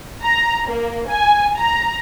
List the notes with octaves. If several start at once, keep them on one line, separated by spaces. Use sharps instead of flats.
A#5
A#3
G#5
A#5